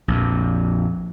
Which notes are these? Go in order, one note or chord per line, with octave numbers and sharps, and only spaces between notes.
A#1 F2